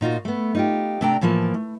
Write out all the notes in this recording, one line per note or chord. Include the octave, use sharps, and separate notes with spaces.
A#2 D#4 F4 F#4
A3 B3
D#4 F4 G4
C3 A3 D4 D5 G5 A#5
A2 E3 F3 A#3 A5
A3